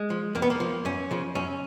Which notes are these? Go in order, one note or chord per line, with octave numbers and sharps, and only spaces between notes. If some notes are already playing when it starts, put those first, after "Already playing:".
Already playing: G#3
F3
F2 A#3
B3
A#3
F3
F#2 C#4
C#3 F3
F#2 C#4